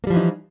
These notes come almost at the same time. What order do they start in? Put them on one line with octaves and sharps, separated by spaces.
A#3 G3 F3 E3 D#4